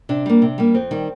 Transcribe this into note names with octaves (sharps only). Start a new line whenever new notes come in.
C3 D4
G3 A#3
C3
G3 A#3
F2 C4
D#3 G3